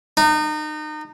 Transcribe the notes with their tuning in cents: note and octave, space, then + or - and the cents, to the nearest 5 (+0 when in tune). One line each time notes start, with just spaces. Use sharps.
D#4 -30